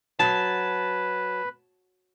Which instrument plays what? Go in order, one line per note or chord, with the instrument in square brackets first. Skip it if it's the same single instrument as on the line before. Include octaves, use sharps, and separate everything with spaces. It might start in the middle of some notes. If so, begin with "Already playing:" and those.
[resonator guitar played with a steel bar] F#3 [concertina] B4 [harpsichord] A5